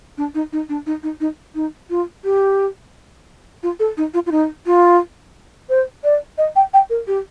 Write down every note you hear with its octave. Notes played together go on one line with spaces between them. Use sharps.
D4
D#4
D#4
D4
D#4
D#4
D#4
D#4
F4
G4
F4
A4
D#4
F4
F4
D#4
F4
C5
D5
D#5
G5
G5
A#4
G4